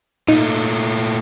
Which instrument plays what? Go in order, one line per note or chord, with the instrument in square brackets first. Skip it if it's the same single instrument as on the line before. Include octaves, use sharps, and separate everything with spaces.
[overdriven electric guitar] A#2 A3 [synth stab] D#4